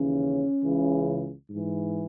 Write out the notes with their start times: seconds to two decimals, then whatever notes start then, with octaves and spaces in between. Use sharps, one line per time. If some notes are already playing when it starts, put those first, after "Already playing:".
Already playing: D#2 C#3 E3 C#4
0.64 C#2 C#3 E3
1.50 G#2 E3